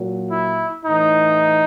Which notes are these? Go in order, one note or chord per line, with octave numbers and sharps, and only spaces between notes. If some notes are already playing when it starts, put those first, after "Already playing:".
Already playing: A#2 F#3
E4
A2 E3 D#4